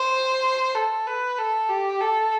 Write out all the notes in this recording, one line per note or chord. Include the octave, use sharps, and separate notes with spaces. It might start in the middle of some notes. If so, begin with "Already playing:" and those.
Already playing: C5
A4
B4
A4
G4
A4